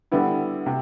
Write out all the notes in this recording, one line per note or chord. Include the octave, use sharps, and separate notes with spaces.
D3 G3 B3 E4
C3